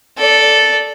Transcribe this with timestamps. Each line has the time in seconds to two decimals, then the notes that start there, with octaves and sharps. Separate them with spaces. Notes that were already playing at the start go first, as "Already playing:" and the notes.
0.18 A4 D5